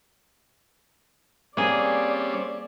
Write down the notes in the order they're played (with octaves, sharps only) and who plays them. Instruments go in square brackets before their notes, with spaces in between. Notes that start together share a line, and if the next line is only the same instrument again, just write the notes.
[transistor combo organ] G3 C4 C#4 [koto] A#3 G#4 [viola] D5